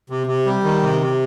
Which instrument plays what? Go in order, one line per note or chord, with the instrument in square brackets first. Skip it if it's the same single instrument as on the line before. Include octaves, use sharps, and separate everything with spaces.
[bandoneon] C3
C3
G3
D#3
C3
C3